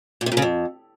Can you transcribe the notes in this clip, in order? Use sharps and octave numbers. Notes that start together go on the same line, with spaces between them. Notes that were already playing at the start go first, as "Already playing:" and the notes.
A#2
C3
A#2
C#3
F2